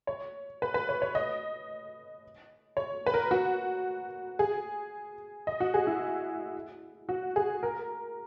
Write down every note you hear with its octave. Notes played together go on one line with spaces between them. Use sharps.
C#5
B4
B4
C#5
C#5
D#5
C#5
B4
A#4
F#4
G#4
D#5
F#4
G#4
E4
F#4
G#4
A#4